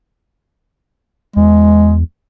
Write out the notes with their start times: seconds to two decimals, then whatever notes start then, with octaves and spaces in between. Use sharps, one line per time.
1.37 E2 G#3